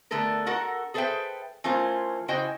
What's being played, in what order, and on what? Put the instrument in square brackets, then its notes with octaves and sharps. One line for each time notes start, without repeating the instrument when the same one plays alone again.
[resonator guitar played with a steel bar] D3 A3 B3 A4 A#4
F#4 A4 A#4 F#5
G#4 A4 B4 C5 E5 G5
E3 A3 C#4 F4 A#4 C5
C#3 E4 F#4 C5 D#5 G5